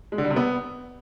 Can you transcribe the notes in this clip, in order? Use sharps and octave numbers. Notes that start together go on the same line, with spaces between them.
G#3
D3
G3
C3
B3